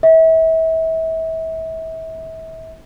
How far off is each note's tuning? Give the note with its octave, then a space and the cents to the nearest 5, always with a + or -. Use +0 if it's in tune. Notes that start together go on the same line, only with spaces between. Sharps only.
E5 -30